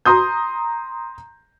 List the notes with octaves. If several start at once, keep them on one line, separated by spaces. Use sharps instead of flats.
A#5 C6 D#6 G6